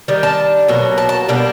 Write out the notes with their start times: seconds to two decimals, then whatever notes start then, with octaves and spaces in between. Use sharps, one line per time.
0.08 D#3 G3
0.23 A5
0.68 B2 F#3 A#3
0.98 A5
1.09 A5
1.28 B2 G3 A#3 D4